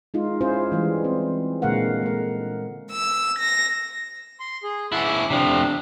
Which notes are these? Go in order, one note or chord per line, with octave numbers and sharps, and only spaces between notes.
G#3 D#4 F4
C#4 E4 F4 G#4 C5
E3 G3 G#3
C4
A#2 D3 G#3 A#4 F5 F#5
G#3 A#4
E6
A#6
C6
G#4
C#4 E4 F#5 A5 C6
D6
C3 F3 D4